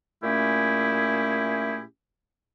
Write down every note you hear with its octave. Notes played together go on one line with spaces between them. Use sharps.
A#2 A3 C#4 E4 G4 G#4